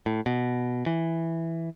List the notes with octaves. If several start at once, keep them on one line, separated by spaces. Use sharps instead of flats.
A2
B2
E3